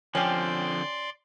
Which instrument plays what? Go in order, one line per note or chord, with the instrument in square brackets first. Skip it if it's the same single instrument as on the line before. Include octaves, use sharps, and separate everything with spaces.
[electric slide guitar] D3 C4 [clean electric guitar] F3 [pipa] C#4 G4 [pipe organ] D5 C6